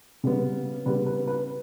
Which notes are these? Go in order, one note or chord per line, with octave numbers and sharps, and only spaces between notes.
C#3 G3 B3
C#3 G3 B3 B4
B4
B4